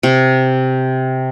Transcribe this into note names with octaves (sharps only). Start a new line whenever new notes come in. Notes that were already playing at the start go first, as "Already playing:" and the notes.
C3